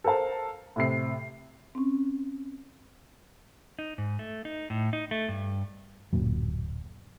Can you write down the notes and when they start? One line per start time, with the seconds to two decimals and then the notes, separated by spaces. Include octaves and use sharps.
0.04 A4 A#4 C5 F5 A5
0.76 A2 C3 C7
1.75 C4 C#4
3.79 D#4
3.98 G#2
4.19 A3
4.45 D#4
4.70 A2
4.93 D#4
5.11 A3
5.28 G2
6.13 D1 F#2 A#2 F#3